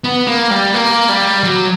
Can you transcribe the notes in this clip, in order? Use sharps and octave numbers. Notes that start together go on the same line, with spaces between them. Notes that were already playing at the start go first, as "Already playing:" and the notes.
B3
A#3
G3
A#3
G3
F#3